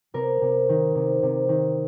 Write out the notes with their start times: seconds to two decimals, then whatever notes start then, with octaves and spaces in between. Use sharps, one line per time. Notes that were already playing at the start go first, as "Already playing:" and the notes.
0.14 C3 A#4
0.41 C3
0.69 D#3
0.95 C3
1.23 C3
1.49 D#3